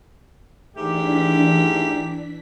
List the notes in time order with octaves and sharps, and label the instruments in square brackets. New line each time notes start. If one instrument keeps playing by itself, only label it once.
[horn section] G#2 A3 G4 [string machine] E3 D4 B6